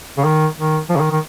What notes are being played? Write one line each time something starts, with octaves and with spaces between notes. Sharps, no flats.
C#3
D#3
D#3
F3
C#3
D#3
D#3